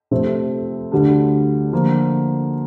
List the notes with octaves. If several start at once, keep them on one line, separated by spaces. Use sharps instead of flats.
F2 C3 F3 A3 C4
D2 D3 G3 D4
D3 F3 A#3